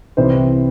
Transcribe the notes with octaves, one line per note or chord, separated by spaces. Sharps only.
C2 C3 E3 C5